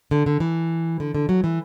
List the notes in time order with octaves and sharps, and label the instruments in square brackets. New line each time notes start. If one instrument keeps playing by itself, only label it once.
[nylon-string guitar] D3
D3
E3
D3
D3
F#3
E3